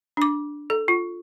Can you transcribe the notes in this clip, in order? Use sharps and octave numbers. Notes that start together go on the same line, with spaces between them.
D4 D6
A4
F4